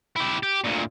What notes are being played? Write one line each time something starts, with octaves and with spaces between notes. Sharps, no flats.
E4 G4
G4
D2 A#2